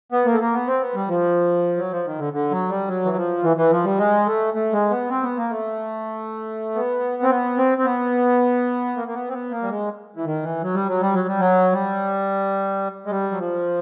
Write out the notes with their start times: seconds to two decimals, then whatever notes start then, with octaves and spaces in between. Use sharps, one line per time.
0.12 B3
0.26 A#3
0.33 A3
0.40 A#3
0.54 B3
0.67 C4
0.81 B3
0.95 G3
1.08 F3
1.78 F#3
1.91 F3
2.05 D#3
2.19 D3
2.33 D3
2.51 F#3
2.70 G3
2.88 F#3
3.05 E3
3.16 F3
3.43 E3
3.57 E3
3.71 F3
3.84 G3
3.98 G#3
4.26 A3
4.54 A3
4.73 G#3
4.90 B3
5.10 C4
5.23 B3
5.37 A#3
5.50 A3
6.75 B3
7.23 C4
7.30 B3
7.58 C4
7.78 C4
7.85 B3
8.97 A#3
9.08 A#3
9.14 B3
9.29 C4
9.33 B3
9.51 A#3
9.62 G3
9.70 G#3
10.16 E3
10.25 D#3
10.43 E3
10.62 F#3
10.75 G3
10.88 F#3
11.01 G3
11.14 F#3
11.28 G3
11.40 F#3
11.72 G3
13.06 G#3
13.10 G3
13.32 F#3
13.38 F3